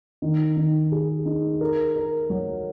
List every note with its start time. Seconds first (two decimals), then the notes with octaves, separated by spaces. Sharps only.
0.22 D#3
0.57 D#3
0.92 G#4
1.25 D#4
1.61 A#4
1.96 A#4
2.30 F#3